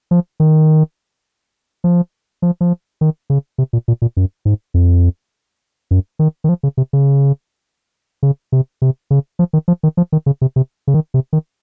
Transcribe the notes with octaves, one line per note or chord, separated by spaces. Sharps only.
F3
D#3
F3
F3
F3
D#3
C#3
C3
A#2
A#2
A#2
F#2
G#2
F2
F#2
D#3
D#3
F3
C#3
C3
C#3
C#3
C3
C3
C#3
F3
D#3
F3
D#3
F3
D#3
C#3
C3
C3
C#3
D#3
C3
D#3